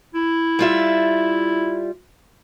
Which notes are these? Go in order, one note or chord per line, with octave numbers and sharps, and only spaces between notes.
E4
G3 F4 E5